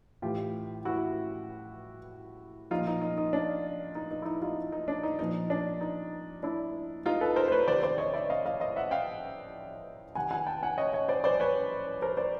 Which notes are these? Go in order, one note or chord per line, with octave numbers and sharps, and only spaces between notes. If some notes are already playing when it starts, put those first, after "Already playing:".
A2 E3 F4 G4
E4 F#4
A#2 F3 D#4 F4
D#4
D#4
D#4
D4
D#4
D#4
E4
D#4
D#4 F4
D#4
D4
D#4
A#2 F3 D#4
D4
D#4
D4 E4
D#4 F4
A4 B4
A#4 C5
C5
B4 C#5
C3 D#3 C5 D5
C5 D5
C#5 D#5
D5 E5
D#5 F5
D#5 F5
D#5 F5
E5 F#5
F5 G5
C3 D#3 F#5 G#5
F#5 G#5
G5 A5
F#5 G#5
C#5 D#5
C#5 D#5
C5 D5
C5 D5
B4 C#5
A#4 C5
C5 D5